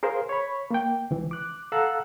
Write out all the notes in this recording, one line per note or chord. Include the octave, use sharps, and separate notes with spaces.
G#4 A#4 C5 F5
C#5 B5
A#3 G5
C#2 E3
D6 F#6
A4 F5 F#5 A#5 E6 F#6